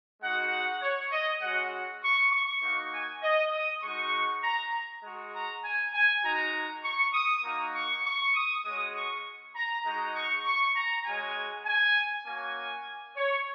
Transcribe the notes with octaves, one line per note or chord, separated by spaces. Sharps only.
G#3 D#4 F#4 F#5
F#5
C#5
D#5
G#3 C#4 F#4 F#5
C#6
C#6
A#3 D#4 F#4
G#5
D#5
D#6
G#3 D#4 F#4 C#6
A#5
G#3 F#4
A#5
G#5
G#5
G#3 D#4 F#4 A#5
C#6
D#6
A#3 D#4 F#4 A#5
C#6
C#6
D#6
G#3 C#4 F#4 D#6
C#6
A#5
G#3 D#4 F#4 A#5
C#6
C#6
A#5
G#3 C#4 F#4 G#5
G#5
A#3 C#4 F#4 G#5
C#5